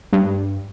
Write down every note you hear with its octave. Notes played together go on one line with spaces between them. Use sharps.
G2